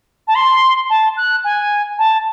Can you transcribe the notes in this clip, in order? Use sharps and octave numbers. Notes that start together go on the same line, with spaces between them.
A5
C6
A5
F#6
G#5
A5